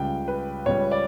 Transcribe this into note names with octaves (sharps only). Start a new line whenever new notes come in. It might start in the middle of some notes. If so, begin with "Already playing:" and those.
Already playing: C#2 C#3 G3 G5
B4
C#2 C#3 G3 C#5
D5